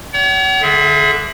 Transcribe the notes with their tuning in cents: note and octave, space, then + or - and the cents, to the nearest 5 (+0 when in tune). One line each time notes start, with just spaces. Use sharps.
C#5 +40 F#5 +45
D3 +0 G#4 +35 E5 +0